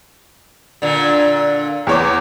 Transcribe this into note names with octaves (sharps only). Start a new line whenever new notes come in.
A#2 D3
E2 C#5 D6